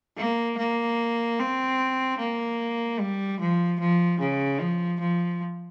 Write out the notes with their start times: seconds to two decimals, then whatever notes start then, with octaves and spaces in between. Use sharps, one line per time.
0.17 A#3
0.58 A#3
1.39 C4
2.19 A#3
3.00 G3
3.40 F3
3.80 F3
4.20 C#3
4.60 F3
5.00 F3